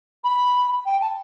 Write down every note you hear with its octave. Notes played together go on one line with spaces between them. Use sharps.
B5
G5
A5